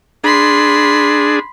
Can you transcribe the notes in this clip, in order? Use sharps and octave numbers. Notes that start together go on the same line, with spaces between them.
D4 G#4 B5 C6